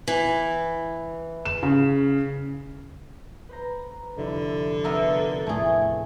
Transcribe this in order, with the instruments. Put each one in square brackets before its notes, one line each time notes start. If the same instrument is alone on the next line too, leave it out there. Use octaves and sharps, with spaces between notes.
[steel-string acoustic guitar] E3
[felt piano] E7
C#3
[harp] B4 C5 A#5
[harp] F1 C2 E4 [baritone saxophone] D3
[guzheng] B3 A#4 E5 [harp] C4
[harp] E2 A2 [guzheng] A3 G#4